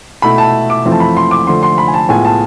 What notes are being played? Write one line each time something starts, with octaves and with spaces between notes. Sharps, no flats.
B2 A3 E4 B5
A5
D6
F2 E3 A3 C4 F4
A5
B5
C6
D6
D3 F3 A3 C6
C6
B5
G#5
A5
A2 G#3 B3 F4 G#5
A5